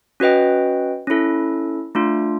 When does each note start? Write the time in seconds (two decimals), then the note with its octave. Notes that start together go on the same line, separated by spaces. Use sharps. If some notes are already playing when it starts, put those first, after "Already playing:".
0.20 C#4 F#4 B4 D#5 G5
1.07 C#4 E4 A4
1.95 A3 D4 F4